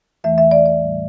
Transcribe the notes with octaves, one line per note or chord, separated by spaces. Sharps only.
E2 E3 A3 E5
E5
D5
D5
A2 G3